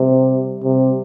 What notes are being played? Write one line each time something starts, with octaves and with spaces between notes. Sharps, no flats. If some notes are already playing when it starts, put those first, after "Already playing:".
Already playing: C3 G3
C3